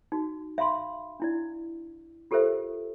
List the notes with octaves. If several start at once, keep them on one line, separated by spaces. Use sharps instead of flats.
D#4 F#4
E5 F5 B5 C6
D4 E4 D5
F4 G4 A4 A#4 C5 E5